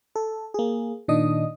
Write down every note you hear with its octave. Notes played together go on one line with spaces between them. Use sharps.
A4
A#3 G#4
A#2 D#3 D4 D#5 D#6